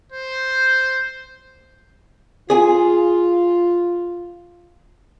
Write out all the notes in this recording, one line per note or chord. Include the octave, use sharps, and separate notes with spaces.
C5
F4 G#4 G#5